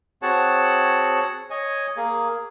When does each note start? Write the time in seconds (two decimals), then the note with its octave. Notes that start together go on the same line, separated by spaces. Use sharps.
0.22 C4 F#4 G#4 C#5 F#5 A5
1.50 C#5 D#5 G#5
1.97 A#3 G#4